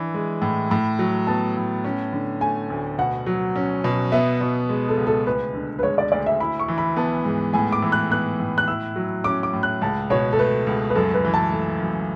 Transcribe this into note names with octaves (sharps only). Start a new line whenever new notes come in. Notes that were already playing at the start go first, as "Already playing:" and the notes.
Already playing: E3 D4
G#3
A2
A2 B5
F#3
B3 A5
A2
C#4
D3
A3 G#5
D2
B2 F#5
F#3
C#4
B2
B3 E5
B2
G#3
A4
C#2
A4
D2 B4
D3
B4
G#3 C#5
D5
D2 D5
E5
E4 B5
C#6
E3
B5
B3 A5
G#2
A2 G#5
D6
E3
F#6
B3 F#6
A2
F#6
E4 E6
F#3
C#4 D6
D6
A2
F#6
C#2 A5
B2 C#5
A4
A3 B4
C#2
B4
F#2 A4
B4
E3
A5
A3
F#2